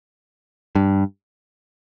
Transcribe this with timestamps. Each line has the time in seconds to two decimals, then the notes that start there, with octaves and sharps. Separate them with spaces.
0.75 G2